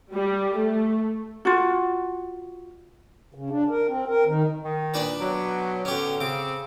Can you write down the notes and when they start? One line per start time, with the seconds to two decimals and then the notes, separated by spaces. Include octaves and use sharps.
0.12 G3
0.55 A3
1.45 F4 F#4
3.34 C#3
3.50 D4
3.69 A#4
3.88 C4
4.08 A#4
4.26 D#3
4.64 D#3
4.94 A#2 D4 B4
5.20 B2 F#3
5.85 B2 D3 C#4 G4
6.20 C#3 C4 D6